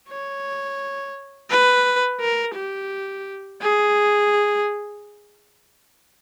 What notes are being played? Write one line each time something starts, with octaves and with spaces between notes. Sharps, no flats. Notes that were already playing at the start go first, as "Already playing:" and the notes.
C#5
B4
A#4
G4
G#4